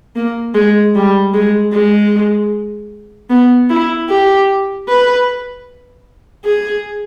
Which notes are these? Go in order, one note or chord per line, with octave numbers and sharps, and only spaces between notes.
A#3
G#3
G3
G#3
G#3
B3
E4
G4
B4
G#4